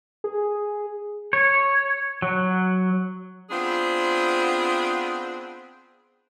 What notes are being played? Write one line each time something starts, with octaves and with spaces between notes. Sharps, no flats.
G#4
C#5
F#3
B3 C4 D4 F4 G#4